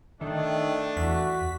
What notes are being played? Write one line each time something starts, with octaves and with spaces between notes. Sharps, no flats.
D#3 A3 D4
E2 F#4 B6